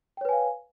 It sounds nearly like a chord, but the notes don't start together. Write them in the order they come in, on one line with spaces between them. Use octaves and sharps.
G5 C#5 B4 G#5 F5